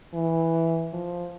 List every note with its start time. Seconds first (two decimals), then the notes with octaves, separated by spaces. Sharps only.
0.14 E3
0.93 F3